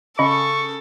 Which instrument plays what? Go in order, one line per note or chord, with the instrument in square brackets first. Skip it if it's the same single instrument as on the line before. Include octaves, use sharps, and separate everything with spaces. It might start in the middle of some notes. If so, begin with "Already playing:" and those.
[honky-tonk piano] C#3 [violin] A4 [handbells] D#5 B5 [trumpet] C#6